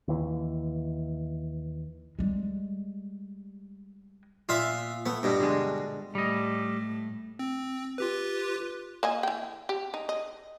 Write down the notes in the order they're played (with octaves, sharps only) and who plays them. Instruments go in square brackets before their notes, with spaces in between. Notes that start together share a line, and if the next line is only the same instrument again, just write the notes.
[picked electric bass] D#2 E3
[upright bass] G3 G#3
[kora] A#2 B3 F5 [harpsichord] F4 E5
[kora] A3 [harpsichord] B3
[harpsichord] G2 B2
[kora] D3 G#3
[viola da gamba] A2 A3 [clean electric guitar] G3 D#5
[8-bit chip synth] C4
F4 G4 B4
[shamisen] A#3 D#5 G#5
E3 G5
G4
D#4
D#5